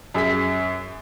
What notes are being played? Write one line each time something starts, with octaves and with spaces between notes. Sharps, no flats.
F#2 G#4 B6